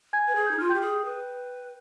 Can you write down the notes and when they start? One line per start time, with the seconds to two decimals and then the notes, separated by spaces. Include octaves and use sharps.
0.13 G#5 G#6
0.27 B4
0.35 G#4 G#6
0.47 D#4 G6
0.58 F4 F6
0.69 G4 G5 G6
0.81 G#4
1.05 B4